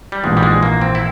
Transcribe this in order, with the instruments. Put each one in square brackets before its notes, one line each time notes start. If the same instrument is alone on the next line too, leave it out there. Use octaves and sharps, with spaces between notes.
[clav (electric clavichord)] G3
[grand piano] A#1 G#2 E3 [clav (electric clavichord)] G#3
[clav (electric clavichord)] G3
G#3
A#3
C4
E4